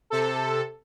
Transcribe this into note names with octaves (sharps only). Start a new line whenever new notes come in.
C3 A4